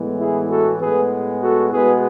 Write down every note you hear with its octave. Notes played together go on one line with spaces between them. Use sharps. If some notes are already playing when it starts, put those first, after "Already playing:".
Already playing: A2 E3 G#3 B3
E4 G#4
F#4 A4
A2 G#3 B3 G#4 B4
F#4 A4
B2 G#3 B3 G#4 B4